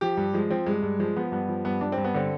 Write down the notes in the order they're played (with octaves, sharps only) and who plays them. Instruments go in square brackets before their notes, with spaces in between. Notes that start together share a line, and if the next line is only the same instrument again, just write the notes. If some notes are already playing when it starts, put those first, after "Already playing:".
[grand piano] F3 G4
G2
F3 G#3
F3 C4
G2 G#3
G2
F3 G#3
F3 B3
G2 B3
F3
G2 B3
G2 D4
G2 C4
B3
D3 C4